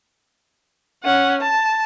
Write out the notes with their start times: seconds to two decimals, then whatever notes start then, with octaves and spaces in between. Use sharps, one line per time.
1.04 C#4 F#5
1.41 A5